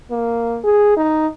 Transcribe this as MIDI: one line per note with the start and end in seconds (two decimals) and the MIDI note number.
0.11 0.58 58
0.64 0.96 68
0.97 1.27 63